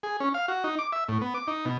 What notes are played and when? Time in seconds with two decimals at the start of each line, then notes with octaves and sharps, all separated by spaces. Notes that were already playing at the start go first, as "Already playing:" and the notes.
0.03 G#4
0.20 C#4
0.34 F5
0.48 F#4
0.64 D#4
0.79 D6
0.92 E5
1.08 A2
1.22 B3
1.34 D6
1.47 D#4
1.65 B2